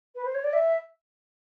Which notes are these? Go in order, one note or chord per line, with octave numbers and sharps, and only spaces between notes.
B4
C5
C#5
D5
E5